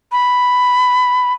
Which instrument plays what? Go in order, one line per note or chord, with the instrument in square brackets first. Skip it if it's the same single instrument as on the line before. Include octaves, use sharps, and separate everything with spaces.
[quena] B5